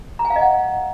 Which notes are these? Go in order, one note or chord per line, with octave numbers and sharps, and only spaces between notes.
A#5
G#5
F5
D#5
F#5